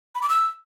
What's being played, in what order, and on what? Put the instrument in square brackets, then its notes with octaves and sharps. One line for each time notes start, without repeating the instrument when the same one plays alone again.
[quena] B5
D6
E6